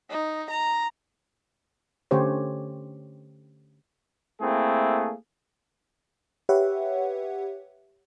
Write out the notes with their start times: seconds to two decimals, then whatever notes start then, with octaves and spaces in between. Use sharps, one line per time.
0.10 D#4
0.50 A#5
2.11 D3 A3 C#4 G4 C5 C#5
4.41 A3 A#3 C4 E4 G#4
6.49 G4 B4 C#5 E5 F#5